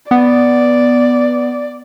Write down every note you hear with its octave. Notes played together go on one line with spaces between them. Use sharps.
B3 D5